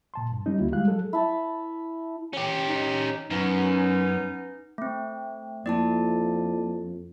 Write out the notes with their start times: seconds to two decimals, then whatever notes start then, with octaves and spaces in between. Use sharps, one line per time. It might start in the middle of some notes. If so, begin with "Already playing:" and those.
0.14 A#2 A5 C6
0.32 G2
0.46 G3 C#4 D#4
0.59 D2 D3 A#3 E4 F#4
0.72 G3 G#3 F5 F#6
0.88 F#3 G#4 A4
1.13 E4 A5
2.33 C#4 G4
2.68 D#4
3.30 F#2 B3 C#4 D#4
4.78 A3 C4
5.66 F2 A#3 E4 D5 A5